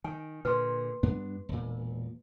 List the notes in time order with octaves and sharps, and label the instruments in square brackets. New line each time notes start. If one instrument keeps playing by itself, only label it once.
[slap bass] D#3 [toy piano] G#5
[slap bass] A#2 D3 [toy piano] B4 C6
[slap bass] G2 B3 D4
E1 A#2